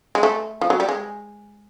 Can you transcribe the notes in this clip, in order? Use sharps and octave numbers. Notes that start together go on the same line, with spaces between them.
G#3
A3
F3
F#3
G3
G#3